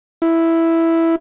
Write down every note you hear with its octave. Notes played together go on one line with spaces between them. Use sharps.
E4